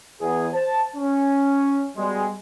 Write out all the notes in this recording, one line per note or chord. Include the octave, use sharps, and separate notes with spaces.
E2 G#4
C5 A5
C#4
B2 G3 G#3